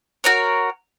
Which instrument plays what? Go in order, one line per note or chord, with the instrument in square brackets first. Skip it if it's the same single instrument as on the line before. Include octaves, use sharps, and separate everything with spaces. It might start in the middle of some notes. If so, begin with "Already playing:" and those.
[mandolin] F#4 A#4 C#5